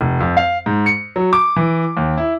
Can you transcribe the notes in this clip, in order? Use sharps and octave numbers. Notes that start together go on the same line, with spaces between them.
F1
F2
F5
G#2
C#7
F#3
D6
E3
D#2
E4